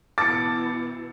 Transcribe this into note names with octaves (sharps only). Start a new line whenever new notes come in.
B2 E3 A5 D6 A6 C#7